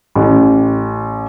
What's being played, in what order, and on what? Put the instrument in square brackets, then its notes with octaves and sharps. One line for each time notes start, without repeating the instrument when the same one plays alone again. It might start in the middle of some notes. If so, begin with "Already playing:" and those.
[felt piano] A1